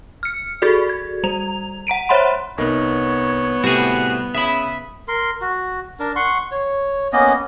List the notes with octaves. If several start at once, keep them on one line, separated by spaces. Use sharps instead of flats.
F6 C#7
F#4 G#4 A4 D5
G#6
G3 A#5 F7
F#5 A#5 D7 D#7
C5 C#5 E5 F#5 B5 C6
C2 B3 D#4 A#4 C#5
A2 C3 G3 F#4 G#4 B4
C#3 E5 B5 D#6
A#4 C6
F#4
D4 A#4
F#5 C6 C#6
C#5
A#3 B3 C#4 D#5